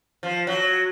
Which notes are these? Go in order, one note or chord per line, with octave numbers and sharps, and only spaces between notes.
F3
F#3